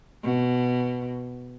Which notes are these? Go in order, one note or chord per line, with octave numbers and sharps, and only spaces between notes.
B2